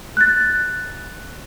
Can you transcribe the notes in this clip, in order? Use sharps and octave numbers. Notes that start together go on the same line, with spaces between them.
F#6 A6